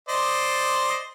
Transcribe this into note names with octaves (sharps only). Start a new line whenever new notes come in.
C5 D5 D#5